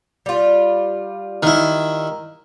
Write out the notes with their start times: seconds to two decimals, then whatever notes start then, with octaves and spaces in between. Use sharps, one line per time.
0.26 G3 F4
1.43 D#3 E4